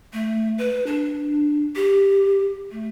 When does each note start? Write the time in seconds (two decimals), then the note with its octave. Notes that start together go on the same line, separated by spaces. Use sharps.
0.13 A3
0.58 B4
0.87 D4
1.76 G4
2.71 A3